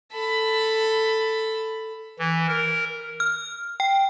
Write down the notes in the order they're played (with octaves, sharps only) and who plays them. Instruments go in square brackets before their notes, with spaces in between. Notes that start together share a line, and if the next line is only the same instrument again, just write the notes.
[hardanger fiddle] A4 B5
[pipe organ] E3
A#4
[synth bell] F6
G5